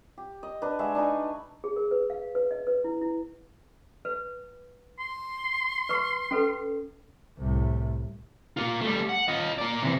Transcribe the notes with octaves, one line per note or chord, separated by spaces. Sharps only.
G4
D#5
D4 B4
G#3 F#4 E5
D4 D#4 G#5 B5
G#4
A#4
B4
F5
B4
D#5
B4
E4
E4
B4
C6
B4 C#6
C#4 A4 B4
C2 A2
A#3 F4
G3 A3
F#5
F4 D#5
A#3 D5
C3 E3